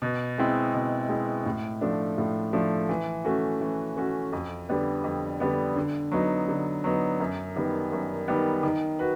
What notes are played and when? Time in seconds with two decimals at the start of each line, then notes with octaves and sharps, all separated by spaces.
0.02 B2
0.38 G#3 C4 E4
0.74 B2
1.09 G#3 C4 E4
1.46 A2
1.81 F3 A3 D4
2.18 A2
2.53 F3 A3 D4
2.89 E3
3.25 A3 C#4 F#4
3.61 E3
3.97 A3 C#4 F#4
4.32 F2
4.69 D3 G3 B3
5.04 F2
5.40 D3 G3 B3
5.76 D3
6.12 F#3 B3 D#4
6.48 D3
6.84 F#3 B3 D#4
7.20 F#2
7.56 D#3 G3 B3
7.92 F#2
8.28 D#3 G3 B3
8.63 D#3
8.99 F#4 B4